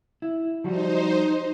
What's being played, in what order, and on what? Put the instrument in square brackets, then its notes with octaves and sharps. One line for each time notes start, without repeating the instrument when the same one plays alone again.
[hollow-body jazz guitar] E4
[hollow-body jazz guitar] F3 G3 F#4 [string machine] D#4 C5